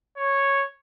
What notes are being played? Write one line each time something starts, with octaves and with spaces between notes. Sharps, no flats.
C#5